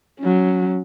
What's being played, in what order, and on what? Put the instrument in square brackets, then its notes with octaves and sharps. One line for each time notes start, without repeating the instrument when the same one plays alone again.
[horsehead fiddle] F#3 C#4